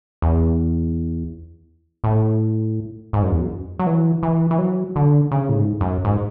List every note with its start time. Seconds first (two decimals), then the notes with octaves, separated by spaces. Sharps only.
0.22 E2
2.04 A2
3.13 G#2
3.23 F#2
3.32 E2
3.41 F#2
3.79 F#3
3.87 E3
4.23 E3
4.51 E3
4.59 F#3
4.96 D3
5.32 C#3
5.49 A2
5.56 G#2
5.81 F#2
6.05 G#2